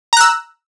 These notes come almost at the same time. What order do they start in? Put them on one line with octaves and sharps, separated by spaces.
A#5 F#6 E6